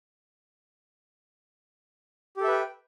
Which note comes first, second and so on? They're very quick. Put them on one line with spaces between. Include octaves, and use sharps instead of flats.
G4 A4 E5 B4 G5